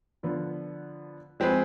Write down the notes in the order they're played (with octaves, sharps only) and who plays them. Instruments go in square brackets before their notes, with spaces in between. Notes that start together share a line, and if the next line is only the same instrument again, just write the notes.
[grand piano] D3 F3 B3 F4
F3 G#3 C4 G#4 B4